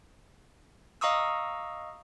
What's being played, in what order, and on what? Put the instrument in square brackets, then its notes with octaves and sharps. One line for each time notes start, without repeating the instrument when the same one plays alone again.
[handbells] D#5 F5 A#5 C#6 D#6 E6